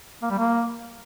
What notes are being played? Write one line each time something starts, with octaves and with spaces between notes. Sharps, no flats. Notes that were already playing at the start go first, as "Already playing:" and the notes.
A#3
G3
A#3